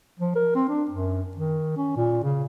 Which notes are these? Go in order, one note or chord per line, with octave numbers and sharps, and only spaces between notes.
F3
A#4
C4
D4
F#2
D#3
C#4
A#2
C#3